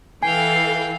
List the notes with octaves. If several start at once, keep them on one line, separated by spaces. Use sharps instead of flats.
E3 A4 F5 G5 G#5 C7